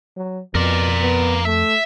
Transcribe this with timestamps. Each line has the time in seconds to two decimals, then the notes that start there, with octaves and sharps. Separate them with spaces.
0.16 F#3
0.55 F2 B2 A#4 D5
1.01 B3
1.45 A3 E5